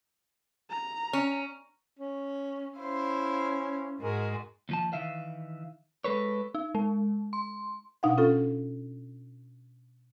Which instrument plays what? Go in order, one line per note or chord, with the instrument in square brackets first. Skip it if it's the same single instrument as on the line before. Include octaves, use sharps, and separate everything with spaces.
[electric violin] A#5
[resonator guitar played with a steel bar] C#4
[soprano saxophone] C#4
[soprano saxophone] C#4 [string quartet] E4 C5 F5
[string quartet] G#2 G#3 F#4 [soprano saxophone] A#4
[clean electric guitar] D#2 F3 A5
D#3 E3 E5 F5
G#3 A4 B4 C#5
[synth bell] D#4
G#3
C6
[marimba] B2 D4 D#4 F5 F#5
C#4 F4 A4